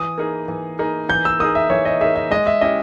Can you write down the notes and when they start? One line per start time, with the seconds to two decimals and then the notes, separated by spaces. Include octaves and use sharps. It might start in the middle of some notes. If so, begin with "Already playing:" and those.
Already playing: E3 D#6
0.18 A#3 D#4 G#4
0.48 E3
0.79 A#3 D#4 G#4
1.09 E3 G6
1.25 E6
1.39 A#3 D#4 G#4 D#6
1.55 E5
1.70 E3 C#5
1.85 D#5
2.01 A#3 D#4 G#4 E5
2.15 E5
2.31 G#3 D#5
2.47 E5
2.61 C#4 E4 G4 D#5